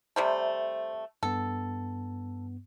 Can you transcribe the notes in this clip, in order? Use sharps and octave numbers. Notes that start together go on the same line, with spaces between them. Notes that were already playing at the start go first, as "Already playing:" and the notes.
C3 G3 A3 C5 A5
G2 B3 A4